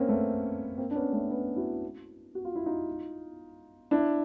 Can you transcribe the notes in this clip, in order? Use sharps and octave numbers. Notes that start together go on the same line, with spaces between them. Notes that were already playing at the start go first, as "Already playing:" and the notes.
Already playing: A#3 C4 C#4
A3 B3
A#3 C4
D4
B3 C#4
A3 B3
B3 C#4
E4 F#4
F#4
F4
E4
D#4 F4
D4 E4